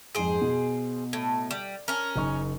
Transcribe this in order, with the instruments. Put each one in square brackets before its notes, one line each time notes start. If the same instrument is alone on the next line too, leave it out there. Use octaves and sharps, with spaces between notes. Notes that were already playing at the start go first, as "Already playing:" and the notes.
[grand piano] F2 G#2 D7 [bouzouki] G#4 C5
[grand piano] B2
[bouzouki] A2
G3
C#4 A#4
[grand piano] F#1 D#4 C#6